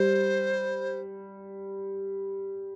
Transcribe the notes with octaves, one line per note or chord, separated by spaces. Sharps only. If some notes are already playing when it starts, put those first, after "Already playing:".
Already playing: G3 C5